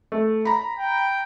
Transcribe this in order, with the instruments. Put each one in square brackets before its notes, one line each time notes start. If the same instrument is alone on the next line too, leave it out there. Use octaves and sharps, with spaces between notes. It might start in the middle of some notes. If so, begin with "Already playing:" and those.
[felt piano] A3
A#5 B5
[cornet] G5